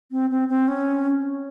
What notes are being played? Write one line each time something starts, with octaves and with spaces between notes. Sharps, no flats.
C4
C4
C4
C#4